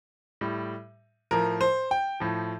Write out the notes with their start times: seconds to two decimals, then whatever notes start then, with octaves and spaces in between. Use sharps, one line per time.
0.41 A2 G3
1.31 A2 F3 A#4
1.61 C5
1.91 G5
2.20 A2 F3